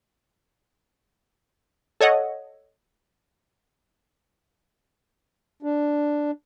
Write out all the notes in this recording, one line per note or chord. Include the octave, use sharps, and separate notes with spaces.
A4 C#5 D#5 F#5
D4